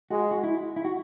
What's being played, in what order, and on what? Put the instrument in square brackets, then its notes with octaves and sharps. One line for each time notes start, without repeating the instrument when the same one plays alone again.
[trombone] G#3 [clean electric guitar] F#4
[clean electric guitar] F#4
E4
E4
F#4